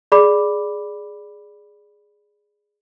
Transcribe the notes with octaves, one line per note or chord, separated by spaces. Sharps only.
G#4 D5 B5 D6